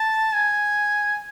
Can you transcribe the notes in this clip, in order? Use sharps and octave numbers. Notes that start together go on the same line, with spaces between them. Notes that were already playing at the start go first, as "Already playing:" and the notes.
Already playing: A5
G#5